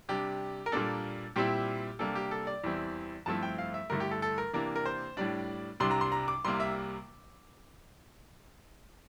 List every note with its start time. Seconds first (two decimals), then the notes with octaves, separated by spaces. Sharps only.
0.09 C3 G3 D4 G4
0.66 A#4
0.72 A#2 G3 A#3 D4 A4
1.36 A#2 G3 C4 E4 G4
1.99 C3 G3 A#3 D4 A4
2.15 G4
2.31 A4
2.47 D5
2.64 E2 E3 G3 C4 E4
3.26 G2 F3 A3 C4 E4 A5
3.43 G5
3.58 F5
3.74 E5
3.90 G2 D3 A3 E4 A#4
4.00 G4
4.11 A4
4.22 A4
4.38 A#4
4.53 C3 E3 A#3 D4 A#4
4.76 A#4
4.86 C5
5.17 A2 G3 D4 D5
5.80 C2 C3 G3 D4 C6
5.91 A#5
6.01 C6
6.12 A#5
6.28 D6
6.45 C2 C3 G3 A#3 C6
6.60 E5